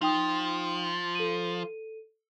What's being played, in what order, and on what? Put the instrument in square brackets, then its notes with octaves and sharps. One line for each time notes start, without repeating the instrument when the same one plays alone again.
[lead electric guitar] F3 [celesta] D#4 G5 D#6
[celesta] A4 D#7